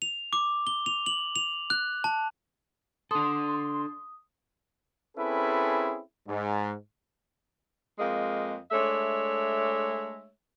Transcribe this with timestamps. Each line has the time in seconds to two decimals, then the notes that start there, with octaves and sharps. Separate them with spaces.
0.02 F7
0.33 D6
0.67 G7
0.86 F7
1.06 F#7
1.36 F7
1.70 F#6
2.04 A5
3.11 D4 A4 C6 D#6
5.17 C4 C#4 E4 G#4 A4 B4
6.27 G#2
7.99 F2 G#3 A#3 D#5 F5
8.71 G#3 A3 D4 C#5 E5